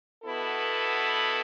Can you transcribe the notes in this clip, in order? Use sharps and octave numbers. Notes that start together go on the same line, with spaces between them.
B2 B3 E4 A4